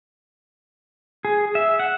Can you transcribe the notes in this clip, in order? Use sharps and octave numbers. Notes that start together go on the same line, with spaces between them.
G#4
E5
F#5